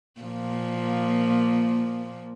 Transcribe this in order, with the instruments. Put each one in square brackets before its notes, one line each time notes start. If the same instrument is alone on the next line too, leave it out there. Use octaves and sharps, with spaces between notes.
[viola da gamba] A#2 F3 A#3